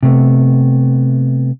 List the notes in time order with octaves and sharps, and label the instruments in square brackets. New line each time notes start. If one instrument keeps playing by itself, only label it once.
[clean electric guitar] C3 A3 B3